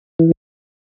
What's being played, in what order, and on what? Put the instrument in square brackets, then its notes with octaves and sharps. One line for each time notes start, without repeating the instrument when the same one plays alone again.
[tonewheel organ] E3